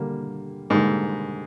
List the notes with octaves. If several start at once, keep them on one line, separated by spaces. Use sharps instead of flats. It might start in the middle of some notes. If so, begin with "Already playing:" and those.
Already playing: D3 G3 A#3
G#2 D3 G3 A#3